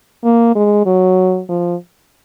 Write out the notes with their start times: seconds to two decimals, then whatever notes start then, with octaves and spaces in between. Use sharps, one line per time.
0.24 A#3
0.55 G#3
0.86 F#3
1.49 F3